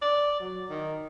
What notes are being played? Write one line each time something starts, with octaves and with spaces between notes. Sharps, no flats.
D5
F#3
D#3